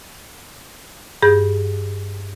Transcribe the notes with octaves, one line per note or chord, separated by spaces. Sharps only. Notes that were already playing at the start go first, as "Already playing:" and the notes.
G2 G#4 G6